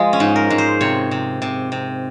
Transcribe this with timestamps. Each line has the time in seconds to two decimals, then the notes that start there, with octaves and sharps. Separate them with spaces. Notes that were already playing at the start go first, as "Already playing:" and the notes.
Already playing: F3 G#3 F4
0.13 C#4
0.20 G#2
0.36 A#4
0.50 G#2
0.58 C5
0.81 C3 C#5
1.11 C3
1.42 C3
1.72 C3